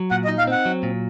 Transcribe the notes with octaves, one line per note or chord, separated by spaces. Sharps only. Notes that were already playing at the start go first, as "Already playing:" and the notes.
Already playing: F#3
A#2 F#5
D#5
D#4
F5
C4 F#5
F#3
A#2